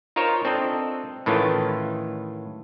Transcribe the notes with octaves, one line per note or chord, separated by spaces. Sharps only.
D#4 F4 A#4 C5 C#5
C4 D4 A4 D#5
A2 D#3 E3 A3 C#4 F4